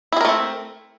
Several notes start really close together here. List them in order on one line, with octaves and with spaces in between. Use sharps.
E4 G#4 A#4 A3 C4